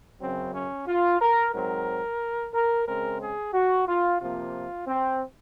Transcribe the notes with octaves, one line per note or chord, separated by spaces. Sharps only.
F#2 C#3 F#3 C4
C#4
F4
A#4
G#2 F#3 C4 A#4
A#4
C#3 G#3 C4 A#4
G#4
F#4
F4
C3 F3 A#3 F4
C4